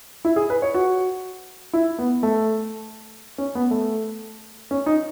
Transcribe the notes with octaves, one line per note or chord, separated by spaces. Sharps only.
E4
G#4
B4
C#5
F#4
E4
B3
A3
C#4
B3
A3
C#4
D#4